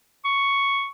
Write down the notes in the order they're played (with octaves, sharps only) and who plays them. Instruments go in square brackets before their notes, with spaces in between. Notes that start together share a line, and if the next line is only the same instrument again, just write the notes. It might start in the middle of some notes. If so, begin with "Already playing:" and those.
[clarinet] C#6